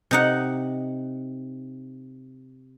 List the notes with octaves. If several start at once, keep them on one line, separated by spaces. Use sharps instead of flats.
C3 D#4 F#5